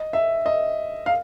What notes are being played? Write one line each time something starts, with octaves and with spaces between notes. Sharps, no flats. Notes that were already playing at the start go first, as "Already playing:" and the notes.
Already playing: D#5
E5
D#5
F5